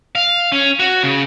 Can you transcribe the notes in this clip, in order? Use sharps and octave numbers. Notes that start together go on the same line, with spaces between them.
F5
C#4
F#4
C#3